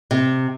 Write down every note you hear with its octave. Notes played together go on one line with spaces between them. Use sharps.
C3